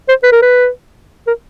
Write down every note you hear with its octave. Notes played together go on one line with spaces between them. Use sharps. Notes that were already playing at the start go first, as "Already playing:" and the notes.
C5
B4
A#4
B4
A#4